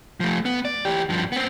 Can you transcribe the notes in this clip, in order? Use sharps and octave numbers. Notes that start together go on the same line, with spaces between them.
F3 A3
B3
D5
E3 G4
G2 F3
B3 C4